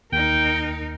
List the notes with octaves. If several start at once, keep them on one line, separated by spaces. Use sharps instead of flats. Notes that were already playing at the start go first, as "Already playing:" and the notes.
D#2 D#4 A#4 G5